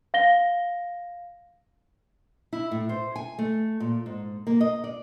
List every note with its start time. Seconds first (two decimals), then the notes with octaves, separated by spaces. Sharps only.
0.14 F5 A#6 G7
2.53 E4
2.71 A2
2.89 C5
3.16 G#5
3.39 A3
3.80 A#2
4.06 G#2
4.47 A#3
4.61 D#5
4.84 D5